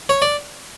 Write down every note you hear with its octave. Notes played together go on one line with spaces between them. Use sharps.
C#5
D5